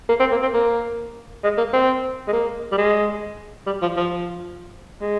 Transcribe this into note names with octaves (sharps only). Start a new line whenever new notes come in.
A#3
C4
A#3
C4
A#3
G#3
A#3
C4
G#3
A#3
G3
G#3
G3
F3
F3
G#3